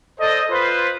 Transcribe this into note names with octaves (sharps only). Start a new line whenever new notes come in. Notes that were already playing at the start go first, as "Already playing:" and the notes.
A4 C5 D5 D#5
F4 B4 C5